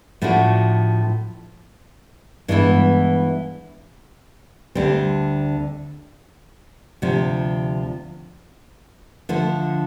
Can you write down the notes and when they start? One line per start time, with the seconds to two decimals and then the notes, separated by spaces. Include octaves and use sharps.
0.22 A2 F3 A3 D4 F#4
2.48 G2 E3 G#3 B3 E4
4.75 D2 D3 G3 C4
7.02 D2 C3 F3
9.29 D3 F3 A3